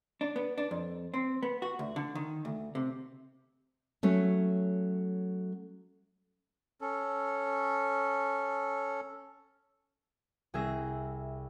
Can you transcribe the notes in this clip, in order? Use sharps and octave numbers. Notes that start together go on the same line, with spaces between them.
D4
B3
D4
F2
C4
B3
F#4
D2
D3
D#3
D2
C3
F#3 A3 C#4
C#4 A4
C2 G#4 E5 A#6